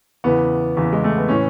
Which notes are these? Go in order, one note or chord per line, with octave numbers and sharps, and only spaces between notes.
E2 C#3 E3 B3
E2 C#3 E3
G#3
A3
B3
A2 E3 C#4